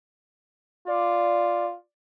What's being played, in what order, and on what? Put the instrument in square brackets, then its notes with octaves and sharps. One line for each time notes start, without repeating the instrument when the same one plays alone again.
[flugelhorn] F4 [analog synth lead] D5